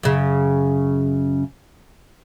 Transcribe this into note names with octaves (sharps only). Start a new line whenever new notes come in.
F#2 C#3